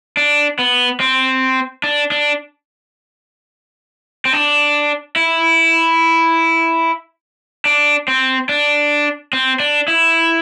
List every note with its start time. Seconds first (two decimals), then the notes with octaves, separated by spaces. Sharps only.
0.17 D4
0.59 B3
1.00 C4
1.83 D4
2.11 D4
4.25 C4
4.33 D4
5.16 E4
7.65 D4
8.08 C4
8.49 D4
9.33 C4
9.60 D4
9.88 E4